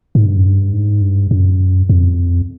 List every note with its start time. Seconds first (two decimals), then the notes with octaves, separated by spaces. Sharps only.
0.15 G#2
0.26 G2
0.37 F#2
0.46 G2
0.73 G#2
1.01 G2
1.31 F#2
1.89 F2